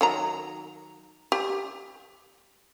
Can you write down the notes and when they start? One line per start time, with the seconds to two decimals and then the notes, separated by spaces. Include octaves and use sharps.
0.01 D#3 F#3 A#5
1.32 G4